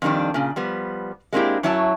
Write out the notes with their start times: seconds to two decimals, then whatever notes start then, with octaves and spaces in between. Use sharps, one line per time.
0.02 F2 A#2 D#3 G3 D4
0.34 A#2 C#3
0.56 F3 G3 B3
1.33 G#3 A#3 C4 D4 E4 G4
1.63 F#2 F#3 E4 C#5 A5